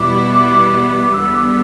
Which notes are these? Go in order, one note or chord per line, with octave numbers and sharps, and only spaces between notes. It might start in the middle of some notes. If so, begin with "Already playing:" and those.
Already playing: E2 B2 G3 B3 E4 D6
D6
D6
D6
D6
E2 D3 G3 B3 E6
D6